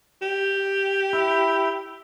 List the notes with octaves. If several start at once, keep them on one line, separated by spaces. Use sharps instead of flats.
G4
E4